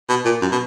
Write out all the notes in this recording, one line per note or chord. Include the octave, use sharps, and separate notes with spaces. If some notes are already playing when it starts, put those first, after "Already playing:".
B2
A#2
F#2
B2